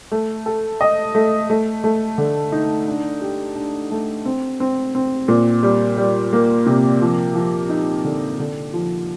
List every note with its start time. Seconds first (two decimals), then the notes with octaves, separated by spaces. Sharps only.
0.12 A3
0.46 A4
0.81 D#5
1.15 A3
1.50 A3
1.84 A3
2.18 D3
2.52 D#4
2.88 D4
3.21 G4
3.56 D4
3.91 A3
4.26 C4
4.60 C4
4.95 C4
5.28 A#2
5.63 G3
5.97 G3
6.33 A#3
6.66 C3
7.01 F3
7.35 F3
7.69 D#4
8.04 D3
8.40 D3
8.73 F3